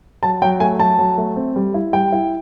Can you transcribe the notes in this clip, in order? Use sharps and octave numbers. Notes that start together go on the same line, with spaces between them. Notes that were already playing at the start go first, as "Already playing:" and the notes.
F#3 A5
F#3 G5
A3 G#5
F#3 A5
F#3
A3
C4
G3
E4
G3 G5
E4